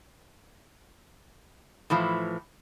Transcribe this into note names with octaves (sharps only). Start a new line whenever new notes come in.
A2 E3 F3